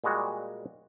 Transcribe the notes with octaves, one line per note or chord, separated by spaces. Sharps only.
A#2 G3 G#3 F#4